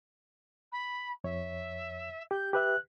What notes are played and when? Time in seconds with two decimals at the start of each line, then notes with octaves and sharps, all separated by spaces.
0.72 B5
1.24 F2 C#5 E5
2.31 G4 G6
2.53 G4 B4 E5 F#6